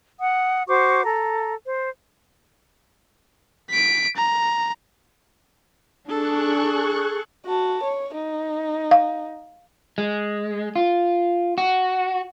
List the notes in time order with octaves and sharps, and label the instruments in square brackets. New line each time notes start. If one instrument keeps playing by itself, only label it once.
[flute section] F#5 D#6
F#4 C5 C#6 D6
A4 A#5
C5
[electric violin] B6 D7
A#5
[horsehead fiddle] D4 [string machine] G#4 C#6 F#6 [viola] A4
[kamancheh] F#4 A5
C#5
D#4
[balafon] F5
[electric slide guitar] G#3
F4
F#4